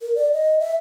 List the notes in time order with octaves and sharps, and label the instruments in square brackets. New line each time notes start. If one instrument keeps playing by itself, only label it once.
[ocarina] A#4
D5
D#5
E5